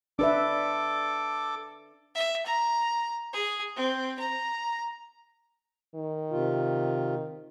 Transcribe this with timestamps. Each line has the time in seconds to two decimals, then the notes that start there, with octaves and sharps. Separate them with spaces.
0.19 D4 A4 B4 E5 D6
2.15 E5
2.46 A#5
3.33 G#4
3.76 C4
4.19 A#5
5.95 D#3
6.32 C3 F4